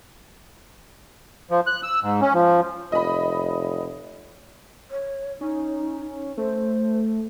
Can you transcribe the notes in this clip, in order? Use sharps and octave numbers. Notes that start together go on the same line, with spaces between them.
F3
F#6
E6
G#2
C#4
F3
F1 D#5 B5
C#5
C#4 D#4
A3 C5